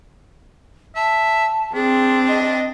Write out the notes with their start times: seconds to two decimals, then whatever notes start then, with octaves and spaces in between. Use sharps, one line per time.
0.96 E5 A5
1.75 C4 D4 G#4
2.28 D#5